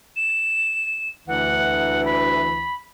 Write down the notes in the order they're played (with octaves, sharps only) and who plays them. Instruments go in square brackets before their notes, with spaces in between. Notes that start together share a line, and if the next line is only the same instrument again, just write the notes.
[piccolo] E7
[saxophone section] D2 E3 [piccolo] F#5
[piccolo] B5